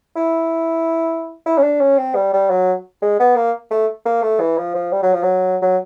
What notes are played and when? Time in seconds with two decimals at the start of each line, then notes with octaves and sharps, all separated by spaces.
0.16 E4
1.46 E4
1.58 C#4
1.63 D4
1.81 C#4
1.98 C4
2.16 G3
2.33 G3
2.50 F#3
3.02 G#3
3.20 B3
3.36 A#3
3.71 A3
4.06 A#3
4.23 A3
4.40 E3
4.58 F3
4.75 F3
4.93 G3
5.03 F#3
5.14 F3
5.23 F#3
5.62 F#3